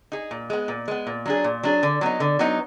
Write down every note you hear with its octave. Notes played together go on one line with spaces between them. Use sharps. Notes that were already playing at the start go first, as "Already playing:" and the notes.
D#4 G#4
A#2
G#3 B3
A#2
G#3 B3
A#2
F#3 D4 G#4
A#2
F#3 D4 G#4
D3
F#3 B3 D#4
D3
F#3 B3 D#4